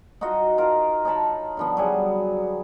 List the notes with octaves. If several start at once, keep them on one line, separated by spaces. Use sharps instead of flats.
D#4 F4 F#4 D#5
F4 A#4 A#5
D#4 C#5 A5 B5
D3 F3 B3
F#3 G3 G#4